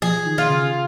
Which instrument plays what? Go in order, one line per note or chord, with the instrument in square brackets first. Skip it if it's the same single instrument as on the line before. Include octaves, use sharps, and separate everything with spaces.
[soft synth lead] F3 [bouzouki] G#4
[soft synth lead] D#3
[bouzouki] F4
[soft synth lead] C#3